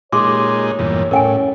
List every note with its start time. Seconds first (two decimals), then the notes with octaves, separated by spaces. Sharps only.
0.12 A#2 G#3 D#4 G4 C#5 C6 D6
0.79 E2 G2 A#2
1.11 A2 C#4 A#4 G5 G#5